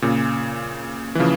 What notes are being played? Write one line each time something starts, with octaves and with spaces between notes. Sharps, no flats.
A#2 C#3
E3
C#3 F3